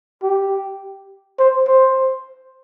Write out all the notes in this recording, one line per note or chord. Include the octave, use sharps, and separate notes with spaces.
G4
C5
C5